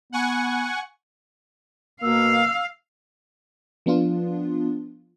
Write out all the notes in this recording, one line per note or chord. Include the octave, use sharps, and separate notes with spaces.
B3 F#5 G#5 C#6
B2 A#3 F5 E6
F3 B3 D4 F4